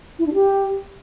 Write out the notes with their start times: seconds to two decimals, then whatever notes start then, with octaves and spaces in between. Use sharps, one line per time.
0.19 E4
0.26 D4
0.34 G4